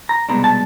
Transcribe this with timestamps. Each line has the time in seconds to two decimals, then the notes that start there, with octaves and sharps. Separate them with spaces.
0.09 A#5
0.29 C2 B2 G#3 B3 D4 A#5
0.44 A5